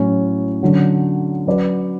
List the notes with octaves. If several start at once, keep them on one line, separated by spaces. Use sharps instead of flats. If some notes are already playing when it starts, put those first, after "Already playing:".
Already playing: A2 F#3 C#4 E4
D3 F#3 C#4
F#3 C#4 F#4 B4 D5